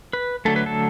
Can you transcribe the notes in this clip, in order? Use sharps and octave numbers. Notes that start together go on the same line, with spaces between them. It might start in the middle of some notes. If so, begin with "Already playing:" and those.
B4
D3 F#3 A3 A4
B4
A4